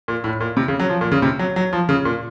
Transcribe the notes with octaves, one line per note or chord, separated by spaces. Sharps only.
A#2
A2
A#2
C3
C#3
F#3
F3
A#2
C#3
C3
F#3
F#3
F3
C#3
A#2